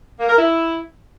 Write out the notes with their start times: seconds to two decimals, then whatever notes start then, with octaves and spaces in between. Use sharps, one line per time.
0.19 A#3
0.28 A#4
0.37 E4